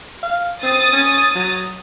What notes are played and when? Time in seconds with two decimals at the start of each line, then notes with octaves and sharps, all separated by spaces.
0.23 F5
0.63 C4 D#6 A6
0.93 C#4
1.35 F#3